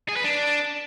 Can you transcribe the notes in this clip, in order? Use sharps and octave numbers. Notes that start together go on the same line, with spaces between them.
G#4
B4
D4